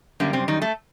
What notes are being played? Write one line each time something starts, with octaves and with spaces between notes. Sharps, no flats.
F#2 D3 G3 A#3
C3 C4
D#3 D#4
A3 A4